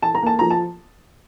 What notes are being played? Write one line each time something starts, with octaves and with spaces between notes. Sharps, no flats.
E3 A5
A#5
A#3 A5
F3 A#5
A5